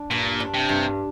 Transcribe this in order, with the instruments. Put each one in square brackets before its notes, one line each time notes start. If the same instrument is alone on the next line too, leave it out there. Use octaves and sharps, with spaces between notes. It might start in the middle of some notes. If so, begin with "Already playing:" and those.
Already playing: [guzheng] D4
[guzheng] G2 [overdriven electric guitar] A#2
[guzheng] D4
[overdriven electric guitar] C3
[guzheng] G2